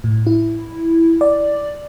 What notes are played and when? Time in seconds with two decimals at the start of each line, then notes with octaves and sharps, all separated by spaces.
0.04 A2
0.27 E4
1.21 D5